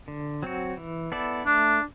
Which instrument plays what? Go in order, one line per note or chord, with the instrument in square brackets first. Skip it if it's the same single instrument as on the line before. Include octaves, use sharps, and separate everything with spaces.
[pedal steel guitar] D3
F#3 C4 F#4
E3
B3 E4 A4 D5
[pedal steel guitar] A3 [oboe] D4